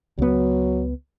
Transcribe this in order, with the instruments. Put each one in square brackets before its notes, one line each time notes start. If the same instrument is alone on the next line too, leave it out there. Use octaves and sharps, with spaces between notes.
[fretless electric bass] C#2 B3 [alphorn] F#3